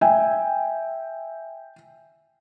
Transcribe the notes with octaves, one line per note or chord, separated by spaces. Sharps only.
E5 G5 G#5